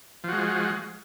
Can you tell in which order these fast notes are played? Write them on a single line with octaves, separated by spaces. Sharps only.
F3 F#4 G#3